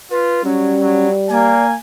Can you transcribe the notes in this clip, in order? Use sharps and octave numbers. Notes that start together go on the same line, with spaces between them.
F4 B4
F#3 G3 C#4
F#3
A#3 D5 G#5